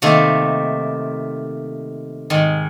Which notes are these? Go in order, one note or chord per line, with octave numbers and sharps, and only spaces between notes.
C3 D#3 A3 A#3
G#2 D#3